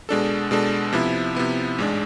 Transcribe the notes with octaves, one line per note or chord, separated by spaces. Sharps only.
B2 G#3 D4 A4
B2 G#3 D4 A4
C3 F3 B3 E4
C3 F3 B3 E4
A1 G#2 G#3 D4